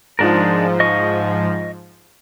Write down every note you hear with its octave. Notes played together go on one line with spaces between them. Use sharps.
G#2 F3 G#3 D4 A#4
D#5 C#6